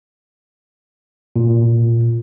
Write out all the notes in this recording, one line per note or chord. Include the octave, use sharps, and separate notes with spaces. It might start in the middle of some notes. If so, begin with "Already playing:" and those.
A#2